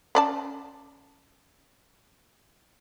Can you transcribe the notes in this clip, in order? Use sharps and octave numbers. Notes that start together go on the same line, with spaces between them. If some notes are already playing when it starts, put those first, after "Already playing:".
C#4 D5 A5